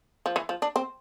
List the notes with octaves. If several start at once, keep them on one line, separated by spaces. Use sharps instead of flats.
F3
E3
F3
D4
C4